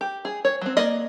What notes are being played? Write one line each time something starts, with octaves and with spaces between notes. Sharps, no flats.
G4
G#4
C#5
F#3 C4
A#3 D5 D#5